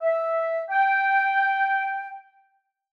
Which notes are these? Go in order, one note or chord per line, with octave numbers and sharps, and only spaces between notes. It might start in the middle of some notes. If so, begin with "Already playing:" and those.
E5
G5